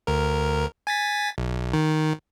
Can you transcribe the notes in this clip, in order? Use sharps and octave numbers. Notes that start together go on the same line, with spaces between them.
D2 A#4
G#5 A6 B6
B1
D#3